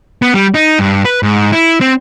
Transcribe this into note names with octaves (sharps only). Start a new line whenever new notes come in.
B3
G3
D#4
G2
B4
G#2
E4
C4